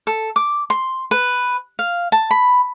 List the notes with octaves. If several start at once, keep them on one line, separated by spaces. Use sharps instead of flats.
A4
D6
C6
B4
F5
A5
B5